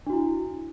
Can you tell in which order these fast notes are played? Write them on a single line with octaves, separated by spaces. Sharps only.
D4 F#4 E4